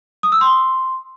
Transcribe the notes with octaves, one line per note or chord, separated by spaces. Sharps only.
D#6
E6
C6